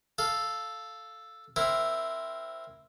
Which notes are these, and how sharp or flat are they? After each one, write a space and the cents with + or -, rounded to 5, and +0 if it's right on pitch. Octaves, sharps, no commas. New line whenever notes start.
A4 +0 F5 +0
C4 -5 E4 +0 A#4 +0